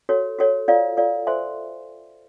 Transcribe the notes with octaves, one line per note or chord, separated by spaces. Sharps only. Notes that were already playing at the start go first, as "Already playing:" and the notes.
F#4 A4 C#5
F#4 A4 C#5
F4 A4 D5 F5
F4 A4 D5 F5
A4 C5 E5 G#5 C6